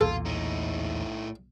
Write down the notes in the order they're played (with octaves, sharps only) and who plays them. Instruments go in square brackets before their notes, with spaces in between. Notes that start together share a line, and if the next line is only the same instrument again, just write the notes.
[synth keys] B1 [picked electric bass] E2 A#2 [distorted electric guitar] F4 [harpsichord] A4
[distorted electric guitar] A2 D#4